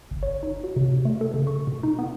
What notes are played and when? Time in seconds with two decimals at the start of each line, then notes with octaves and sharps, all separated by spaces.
0.11 G1
0.23 C#5
0.43 D#4
0.64 F#4
0.76 C3
1.05 A3
1.21 A4
1.34 C#3
1.47 C#6
1.67 B2
1.83 D#4
1.99 B3